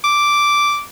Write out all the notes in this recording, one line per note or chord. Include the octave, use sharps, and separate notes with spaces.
D6